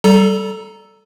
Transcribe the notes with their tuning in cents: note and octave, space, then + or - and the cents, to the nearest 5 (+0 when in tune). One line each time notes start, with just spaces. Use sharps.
G3 -20 A4 +0 A#5 +0